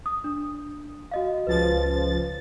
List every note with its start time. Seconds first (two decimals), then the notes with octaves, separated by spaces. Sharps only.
0.06 D#6
0.24 D4
1.11 F#4 D#5 F5
1.47 C#2 F3 B4 A6